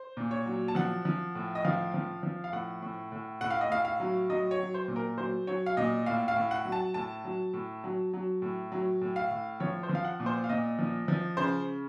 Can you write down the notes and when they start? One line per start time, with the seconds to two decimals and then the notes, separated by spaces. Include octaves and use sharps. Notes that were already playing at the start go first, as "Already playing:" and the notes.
Already playing: C5
0.17 A#2
0.31 C#5
0.46 F#3
0.68 A5
0.75 F3 F#5
1.05 F3
1.35 A2
1.55 D#5
1.65 F3 F5
1.94 F3
2.23 F3
2.44 F5
2.52 A2 F#5
2.82 A2
3.12 A2
3.41 A2 F#5
3.51 F5
3.61 D#5
3.70 A2 F5
3.85 F5
4.00 F#3
4.30 F#3 D#5
4.51 C#5
4.59 F#3
4.74 C5
4.88 A#2
4.96 A#4
5.17 F#3 C5
5.47 F#3 C#5
5.66 F5
5.77 A#2 D#5
6.06 A2 F5
6.28 F5
6.36 A2
6.51 F#5
6.65 F#3
6.72 A5
6.94 A2 A5
7.24 F#3
7.53 A2
7.84 F#3
8.14 F#3
8.42 A2
8.72 F#3
9.01 A2
9.16 F5
9.31 A2
9.60 F3 C#5
9.83 C5
9.89 F3
9.95 F5
10.04 F#5
10.20 A#2
10.26 C5
10.44 F5
10.49 A#2 D#5
10.79 F3
11.08 F3
11.37 C#3 C5